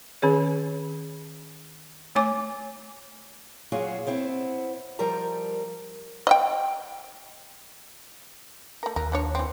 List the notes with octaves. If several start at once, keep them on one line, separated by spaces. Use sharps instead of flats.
D#3 C#4 G#4 C#5
A3 C#5 G#5 D6
A#2 F#3 F4 F#4 G#4
B3 C4 E4 C5
F3 G3 A#4 A#5
D#5 E5 G5
A3 A#4
D#2 A#4
F3 D4 C#5
E3 C4